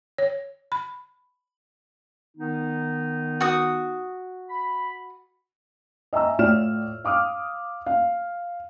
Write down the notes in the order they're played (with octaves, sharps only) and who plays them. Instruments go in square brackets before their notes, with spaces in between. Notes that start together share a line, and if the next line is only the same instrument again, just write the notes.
[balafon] C#5
B5
[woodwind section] D#3 B3 D#4
[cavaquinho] F#4 D#6
[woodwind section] B5
[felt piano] D#5 E5 G#5 A#5 E6
A2 F4 D5 F6 E7
F5 D6 D#6 F6
F5